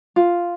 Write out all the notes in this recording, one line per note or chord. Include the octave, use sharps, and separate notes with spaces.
F4